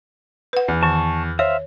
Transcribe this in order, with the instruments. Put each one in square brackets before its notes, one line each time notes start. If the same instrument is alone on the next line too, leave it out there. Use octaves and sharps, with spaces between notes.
[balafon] B4 F#5
[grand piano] E2
[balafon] D#3 [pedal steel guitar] A5 C#6
[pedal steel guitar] C5 E5 F5 [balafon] C#5